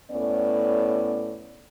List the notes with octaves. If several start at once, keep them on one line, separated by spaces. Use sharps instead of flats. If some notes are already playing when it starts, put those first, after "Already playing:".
A2 B3 C#4 D5